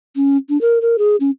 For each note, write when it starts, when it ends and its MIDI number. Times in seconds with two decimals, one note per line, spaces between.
0.16 0.37 61
0.49 0.60 62
0.61 0.79 70
0.81 0.96 70
0.98 1.16 68
1.20 1.31 61